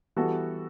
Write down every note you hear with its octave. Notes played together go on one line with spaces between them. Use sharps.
E3 G3 B3 F#4 A4